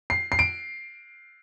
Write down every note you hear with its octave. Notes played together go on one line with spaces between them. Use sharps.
C7
C7
D7